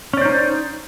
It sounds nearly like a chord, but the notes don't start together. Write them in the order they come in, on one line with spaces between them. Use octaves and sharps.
C#4 D5 C5 D#4